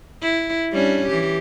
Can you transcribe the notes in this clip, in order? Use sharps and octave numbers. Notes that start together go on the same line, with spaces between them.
E4
G3 C#4 D4
E3 G4